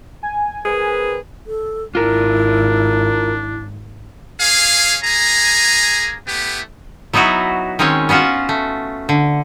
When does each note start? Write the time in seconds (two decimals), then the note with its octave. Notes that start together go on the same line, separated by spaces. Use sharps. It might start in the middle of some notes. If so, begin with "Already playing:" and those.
0.23 G#5
0.65 C4 G#4 A#4 B4
1.47 A4
1.95 G#1 D4 E4 F4 A#4
4.40 C#4 G#4 F5
5.03 A#3 G#4 G#5 A#5
6.27 A3 B3 E4 G4
7.13 F#3 B3 D#4 E4 F#4
7.79 D#3 G#3 C4 C#4 C#5
8.09 B3 C#4 F4 F#4 F#5
8.49 A3
9.09 D3